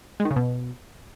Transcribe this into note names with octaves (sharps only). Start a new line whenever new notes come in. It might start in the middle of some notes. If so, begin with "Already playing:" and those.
G#3
D#3
C#3
B2